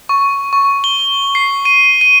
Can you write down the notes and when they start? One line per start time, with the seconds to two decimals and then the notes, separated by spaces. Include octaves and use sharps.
0.09 C#6
0.53 C#6
0.84 G7
1.35 C7
1.65 D#7
2.01 D#7